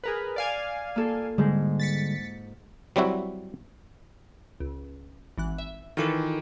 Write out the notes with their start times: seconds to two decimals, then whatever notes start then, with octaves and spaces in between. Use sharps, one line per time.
0.04 G#4 A#4 B4
0.36 D5 F5 G#5
0.96 A#3 F4 A4
1.38 G#2 D3 G3 G#3
1.80 A6 B6 C#7
2.96 F#3 G3 C4 E4 F#4
4.60 C#2
5.38 G#1 E3 F#6
5.58 E5
5.97 D#3 E3 F4 A4 B4